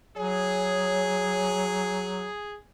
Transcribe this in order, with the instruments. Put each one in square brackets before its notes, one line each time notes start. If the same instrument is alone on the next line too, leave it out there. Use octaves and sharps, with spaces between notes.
[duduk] F#3 [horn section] G#4 [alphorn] C#5